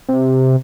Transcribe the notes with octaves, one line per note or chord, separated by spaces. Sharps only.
C3